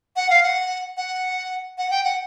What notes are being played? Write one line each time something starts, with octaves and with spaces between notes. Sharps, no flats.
F#5
F5
F#5
F#5
F#5
G5
F#5